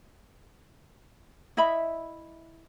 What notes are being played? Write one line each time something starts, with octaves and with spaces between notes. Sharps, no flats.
E4 D#5 E5 B5